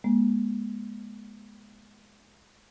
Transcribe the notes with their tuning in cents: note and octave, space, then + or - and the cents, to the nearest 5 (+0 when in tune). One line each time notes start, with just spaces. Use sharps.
G#3 +0 B3 -45